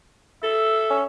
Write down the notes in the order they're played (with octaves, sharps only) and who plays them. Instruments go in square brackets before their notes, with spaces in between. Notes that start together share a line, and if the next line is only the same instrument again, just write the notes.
[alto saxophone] A4 [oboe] E5
[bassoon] C#4